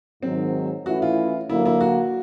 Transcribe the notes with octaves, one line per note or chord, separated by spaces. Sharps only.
G#2 D#3 F#3 C4
E3 A3 C#4 E4 F#4
F4
D3 F#3 A#3 E4
E4
F#4